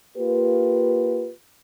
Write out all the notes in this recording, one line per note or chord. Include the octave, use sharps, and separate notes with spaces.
A#3 F4 G4 B4